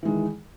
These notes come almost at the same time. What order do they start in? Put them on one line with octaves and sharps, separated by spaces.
E3 G#3 D#3